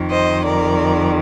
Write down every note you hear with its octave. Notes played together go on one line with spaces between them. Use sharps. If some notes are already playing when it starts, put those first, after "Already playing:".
Already playing: F2 D#3
C5 D#5
A#4 D5